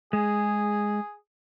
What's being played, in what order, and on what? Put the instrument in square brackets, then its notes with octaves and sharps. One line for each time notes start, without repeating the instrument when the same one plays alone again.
[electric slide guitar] G#3 [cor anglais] G#4